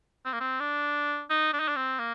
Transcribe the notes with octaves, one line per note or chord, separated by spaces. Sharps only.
C4
A#3
C4
D4
D#4
D4
D#4
D4
C4
A#3